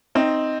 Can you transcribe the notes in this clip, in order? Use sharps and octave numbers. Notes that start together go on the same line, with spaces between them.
C4 D#4